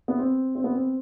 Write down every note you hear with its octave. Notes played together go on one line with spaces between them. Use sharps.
B3
C4
C4
B3
C4